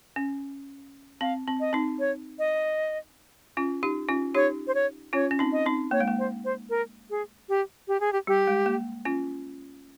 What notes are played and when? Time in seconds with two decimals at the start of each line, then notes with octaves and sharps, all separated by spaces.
0.16 C#4
1.21 C4 F5
1.48 C4
1.60 D#5
1.73 C4 D#4
1.99 C#5
2.39 D#5
3.57 C#4 F4
3.83 D#4 G4
4.09 C#4 F4
4.35 D#4 G4 C#5
4.67 C5
4.75 C#5
5.13 C#4 F4 C#5
5.31 C#4
5.39 C4 D#4
5.52 D#5
5.66 C4 D#4
5.91 A#3 C#5
6.00 G#3
6.08 A#3
6.19 C5
6.45 C5
6.70 A#4
7.10 G#4
7.49 G4
7.88 G4
8.00 G#4
8.13 G4
8.27 G3 G4
8.47 G#3
8.66 A#3
9.05 C#4 F4